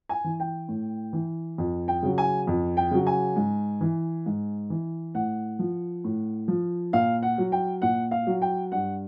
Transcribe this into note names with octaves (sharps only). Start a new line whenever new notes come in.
G#5
E3
G5
A2
E3
F2
G5
C#3 F#3
G#5
F2
G5
C#3 F#3
G#5
G#2
E3
G#2
E3
A2 F#5
F3
A2
F3
A#2 F5
F#5
F#3
G5
A#2 F#5
F5
F#3
G5
G2 F#5